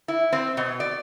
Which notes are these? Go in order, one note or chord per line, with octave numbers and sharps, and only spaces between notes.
E4
C4
B2
D5